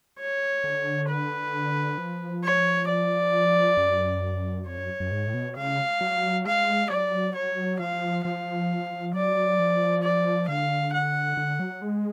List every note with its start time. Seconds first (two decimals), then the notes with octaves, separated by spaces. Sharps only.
0.19 C#5
0.64 D3
1.09 B4
1.98 F3
2.43 C#5
2.88 D5
3.77 F#2
4.66 F2 C#5
4.78 F#2
5.00 F#2
5.12 G#2
5.27 A2
5.34 B2
5.56 C#3 F5
6.01 F#3
6.46 G#3 F5
6.90 F#3 D5
7.35 C#5
7.79 F3 F5
8.24 F3 F5
9.14 F#3 D5
9.59 F3
10.03 D5
10.48 D3 F5
10.93 F#5
11.37 D3
11.60 F#3
11.82 G#3